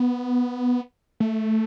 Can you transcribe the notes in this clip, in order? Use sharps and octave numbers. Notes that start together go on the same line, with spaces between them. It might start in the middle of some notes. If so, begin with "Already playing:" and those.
Already playing: B3
A3